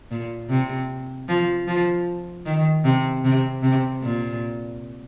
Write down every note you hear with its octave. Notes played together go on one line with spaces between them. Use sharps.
A#2
C3
F3
F3
D#3
C3
C3
C3
A#2